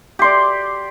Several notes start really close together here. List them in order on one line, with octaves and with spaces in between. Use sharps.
G4 C6 D5